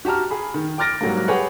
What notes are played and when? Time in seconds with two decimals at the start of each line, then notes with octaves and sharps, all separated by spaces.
0.05 F#4 G4 A5 A#5 F6
0.31 G#4 B5
0.54 D#3
0.78 G5 D6 F6 A6 A#6 D7
1.01 G#2 F#3 G3 A#3
1.28 G4 G#4 B4 C#5 F#5